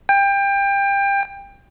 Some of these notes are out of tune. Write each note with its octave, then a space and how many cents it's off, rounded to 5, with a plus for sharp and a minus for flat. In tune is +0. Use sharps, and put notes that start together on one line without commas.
G5 +25